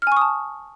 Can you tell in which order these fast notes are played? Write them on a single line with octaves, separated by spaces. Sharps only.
F6 G#5 C#6 D#6 A5